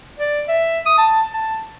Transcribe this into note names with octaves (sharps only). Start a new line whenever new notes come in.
D5
E5
D#6
A5
A5